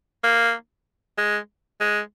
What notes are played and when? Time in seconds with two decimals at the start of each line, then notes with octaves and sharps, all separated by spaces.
0.24 A#3
1.18 G#3
1.81 G#3